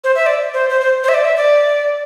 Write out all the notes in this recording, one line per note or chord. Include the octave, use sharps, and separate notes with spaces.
C5
E5
D5
C5
C5
C5
C5
E5
D5
E5
D5